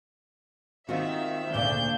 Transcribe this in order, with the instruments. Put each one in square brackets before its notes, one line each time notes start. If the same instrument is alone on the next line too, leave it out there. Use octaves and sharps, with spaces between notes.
[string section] D#3 E5 [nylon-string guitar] C4 F4 F#4
[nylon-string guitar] D2 A#2 C#3 [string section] D4 G6